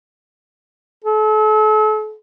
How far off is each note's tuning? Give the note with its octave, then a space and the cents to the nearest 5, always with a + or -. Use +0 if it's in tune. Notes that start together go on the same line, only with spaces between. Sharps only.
A4 -40